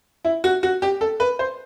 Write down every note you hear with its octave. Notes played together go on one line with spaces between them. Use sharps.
E4
F#4
F#4
G4
A4
B4
C5